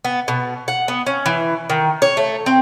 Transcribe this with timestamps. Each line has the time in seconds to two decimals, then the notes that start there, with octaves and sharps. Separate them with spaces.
0.05 B3
0.28 B2
0.68 F#5
0.88 B3
1.07 C#4
1.26 E3
1.70 D#3
2.02 C#5
2.17 A3
2.46 C4